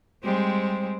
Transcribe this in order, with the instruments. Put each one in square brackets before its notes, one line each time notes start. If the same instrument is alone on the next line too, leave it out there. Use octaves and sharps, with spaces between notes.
[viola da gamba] G3 G#3 C4